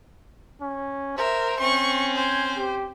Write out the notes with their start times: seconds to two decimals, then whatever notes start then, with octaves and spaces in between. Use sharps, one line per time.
0.62 C#4
1.18 A#4 C5 E5
1.60 C4 C#4 C#6
2.16 C5 G#5
2.57 G4